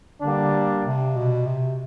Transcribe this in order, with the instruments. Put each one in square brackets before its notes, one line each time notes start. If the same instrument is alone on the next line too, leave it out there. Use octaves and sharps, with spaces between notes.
[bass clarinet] D3 [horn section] G3 A#3 D4
[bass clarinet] C3
B2
C3